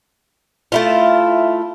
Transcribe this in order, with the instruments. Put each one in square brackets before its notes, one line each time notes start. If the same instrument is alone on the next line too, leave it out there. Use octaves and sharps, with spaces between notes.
[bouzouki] A3 E4 F4